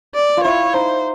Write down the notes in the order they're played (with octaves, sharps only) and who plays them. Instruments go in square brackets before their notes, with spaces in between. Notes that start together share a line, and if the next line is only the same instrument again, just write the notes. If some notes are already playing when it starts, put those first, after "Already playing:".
[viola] D5
[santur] F4
[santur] E4 [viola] C#5
[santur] D#4 [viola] C5